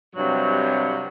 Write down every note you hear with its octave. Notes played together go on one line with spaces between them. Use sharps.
G2 C3 F#3